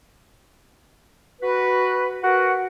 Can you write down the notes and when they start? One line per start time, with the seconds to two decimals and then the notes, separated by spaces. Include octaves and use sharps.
1.41 F#4 B4
2.23 F#4 A#4 B4 F#5